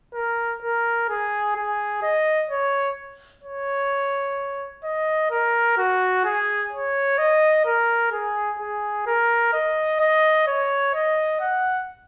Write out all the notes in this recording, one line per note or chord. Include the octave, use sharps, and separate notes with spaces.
A#4
A#4
G#4
G#4
D#5
C#5
C#5
D#5
A#4
F#4
G#4
C#5
D#5
A#4
G#4
G#4
A#4
D#5
D#5
C#5
D#5
F#5